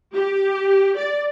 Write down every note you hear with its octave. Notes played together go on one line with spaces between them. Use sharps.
G4
D5